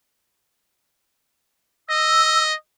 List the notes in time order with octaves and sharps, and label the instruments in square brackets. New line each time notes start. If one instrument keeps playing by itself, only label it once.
[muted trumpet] D#5 [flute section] E6